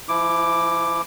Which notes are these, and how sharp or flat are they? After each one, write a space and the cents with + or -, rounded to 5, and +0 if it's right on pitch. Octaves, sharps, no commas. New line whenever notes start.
F3 -35 E4 +0 D6 +0